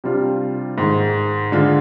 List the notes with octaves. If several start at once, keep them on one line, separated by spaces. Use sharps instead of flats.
C3 G3 D4 F4
G#2 D#3 G#3
D3 G#3 D4 F4